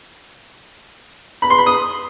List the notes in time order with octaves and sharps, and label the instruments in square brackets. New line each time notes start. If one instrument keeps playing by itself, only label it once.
[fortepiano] B5
C6
B5
D#6